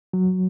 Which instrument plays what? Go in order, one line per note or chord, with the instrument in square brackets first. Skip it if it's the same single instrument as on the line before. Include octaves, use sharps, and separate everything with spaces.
[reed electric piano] F#3